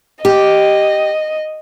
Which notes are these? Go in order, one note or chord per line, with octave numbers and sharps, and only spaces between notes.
G4 D#5